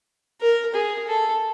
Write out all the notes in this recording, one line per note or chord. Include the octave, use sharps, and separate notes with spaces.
A#4
G#4
A4